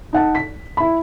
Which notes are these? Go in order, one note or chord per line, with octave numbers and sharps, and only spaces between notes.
D#4 F#5 A5
B6
E4 B5